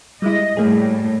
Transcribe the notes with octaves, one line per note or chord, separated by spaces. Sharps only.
G3 G#3 E4 D#5
A2 G3 A#3 G#4